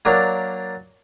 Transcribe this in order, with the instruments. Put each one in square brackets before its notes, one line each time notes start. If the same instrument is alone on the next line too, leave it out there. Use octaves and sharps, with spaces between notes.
[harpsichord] F#3 A#3 D4 A#4 D5